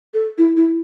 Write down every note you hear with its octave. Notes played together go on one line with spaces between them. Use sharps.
A4
E4
E4